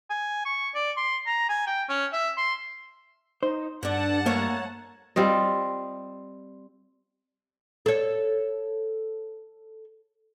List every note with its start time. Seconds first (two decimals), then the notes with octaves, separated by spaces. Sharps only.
0.10 G#5
0.46 C#6
0.75 D5
0.97 C6
1.26 A#5
1.49 G#5
1.67 G5
1.89 C#4
2.13 E5
2.38 C6
3.43 D#4 C5
3.83 G2 D3 D4 F#5 A5
4.26 A3 A#3 C#5 A#5
5.16 G3 C4 F4 D#5
7.86 A4 C#5